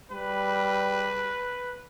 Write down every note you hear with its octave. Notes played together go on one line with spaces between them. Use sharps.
G3 B4